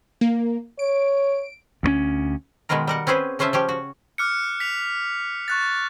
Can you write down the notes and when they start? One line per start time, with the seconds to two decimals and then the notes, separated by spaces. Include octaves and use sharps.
0.21 A#3
0.79 C#5 D7
1.83 D2 G#3 C#4
2.69 B2 D#3 G#3 B3 F4 A#4
2.87 G3 A#4 F#5
3.07 C4 C#4 G#4 B4 C5
3.39 C#3 C#4 F4 C5 E5 A5
3.53 F3 C#4 G4
3.69 F#4
4.18 D6 F6 F#6 C#7
4.60 B6 F7
5.48 C#6 F#6 A6